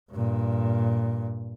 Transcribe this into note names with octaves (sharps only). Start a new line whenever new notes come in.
G2 A#2